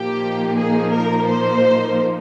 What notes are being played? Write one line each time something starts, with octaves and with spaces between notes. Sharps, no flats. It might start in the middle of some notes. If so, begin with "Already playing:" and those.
Already playing: A#2 F3 A#3 D#4 G4
G#4
A#4
C5